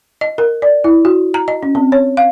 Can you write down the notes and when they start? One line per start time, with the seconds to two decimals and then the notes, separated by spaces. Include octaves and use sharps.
0.21 D#5
0.38 A#4
0.62 D5
0.84 E4
1.05 F#4
1.34 A#5
1.48 D#5
1.63 C#4
1.75 C4
1.92 C#5
2.17 F5